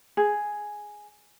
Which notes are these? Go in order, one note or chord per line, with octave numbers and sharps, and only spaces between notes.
G#4